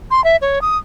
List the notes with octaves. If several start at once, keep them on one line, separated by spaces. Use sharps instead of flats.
C6
E5
C#5
D#6